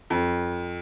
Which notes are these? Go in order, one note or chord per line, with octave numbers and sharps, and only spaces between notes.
F2